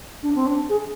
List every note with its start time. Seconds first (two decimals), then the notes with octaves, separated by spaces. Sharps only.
0.23 D4
0.35 C4
0.47 D4
0.69 G#4